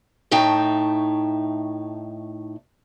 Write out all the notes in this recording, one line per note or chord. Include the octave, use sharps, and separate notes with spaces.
A2 A3 D#4 E5 G5 A5